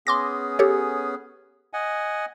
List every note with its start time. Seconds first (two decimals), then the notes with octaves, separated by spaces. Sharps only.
0.07 B3 C#4 G#4 C6 D6 A#6
0.59 G4 A4 C#5
1.73 D#5 F#5 G#5